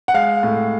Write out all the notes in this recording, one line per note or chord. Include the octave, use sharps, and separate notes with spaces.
F#5
G#3 F5
A2